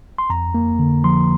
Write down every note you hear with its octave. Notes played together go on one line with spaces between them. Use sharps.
C6
F2 A#5
A#3
D3
F3 C6